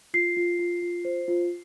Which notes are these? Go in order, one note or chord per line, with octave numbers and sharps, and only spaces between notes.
F4 C7
F4
F4
F4
C5
F4